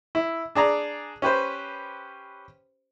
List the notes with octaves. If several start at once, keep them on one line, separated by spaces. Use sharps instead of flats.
E4
D4 G#4 D5 A#5
C#4 G4 B4 C5